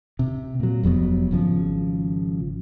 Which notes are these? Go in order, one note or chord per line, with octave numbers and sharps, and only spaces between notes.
C3
A#2 F#3
F1 F2 F#3 B3
G#1 C#3 F3